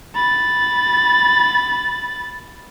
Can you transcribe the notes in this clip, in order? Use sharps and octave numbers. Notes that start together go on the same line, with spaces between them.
B5 A6